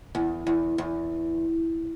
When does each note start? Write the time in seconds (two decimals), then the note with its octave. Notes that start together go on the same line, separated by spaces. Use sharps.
0.15 E2
0.47 E2
0.78 E2